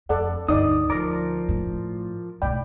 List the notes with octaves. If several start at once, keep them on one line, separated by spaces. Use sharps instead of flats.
F2 A4 D5 F#5
D2 G2 D#4 D5 D#6
D2 F3 A#4 D5 A#5
A2
B1 A2 D5 G5 B5